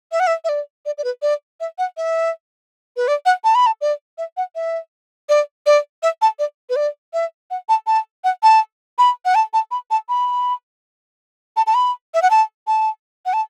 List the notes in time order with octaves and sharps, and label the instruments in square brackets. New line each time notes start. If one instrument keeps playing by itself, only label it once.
[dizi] E5
F#5
E5
E5
D5
D5
D5
B4
D5
E5
F#5
E5
B4
D5
F#5
A5
B5
A5
D5
E5
F#5
E5
D5
D5
E5
A5
D5
B4
D5
E5
F#5
A5
A5
F#5
A5
B5
F#5
A5
A5
B5
A5
B5
A5
A5
B5
E5
F#5
A5
A5
F#5
A5